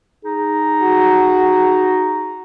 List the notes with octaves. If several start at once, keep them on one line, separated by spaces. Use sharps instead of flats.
D#4 G#4
F#4